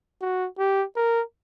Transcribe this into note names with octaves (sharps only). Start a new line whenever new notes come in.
F#4
G4
A#4